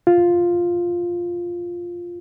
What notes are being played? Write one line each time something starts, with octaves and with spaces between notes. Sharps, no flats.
F4